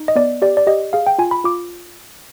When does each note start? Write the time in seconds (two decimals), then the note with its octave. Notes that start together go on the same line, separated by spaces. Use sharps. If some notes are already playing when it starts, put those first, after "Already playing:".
Already playing: D#4
0.08 D#5
0.16 B3 D5
0.42 G4 D5
0.57 D5
0.67 G4 D#5
0.93 G#4 F5
1.07 G5
1.18 F4 G#5
1.31 B5
1.44 F4 D6